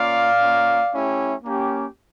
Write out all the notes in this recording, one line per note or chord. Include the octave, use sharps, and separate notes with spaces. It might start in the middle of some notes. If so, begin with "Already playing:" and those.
Already playing: A#3 C#4 F4 D5 F5
A#3 C#4 F4
A3 C#4 E4 G4
A#3 C#4 G4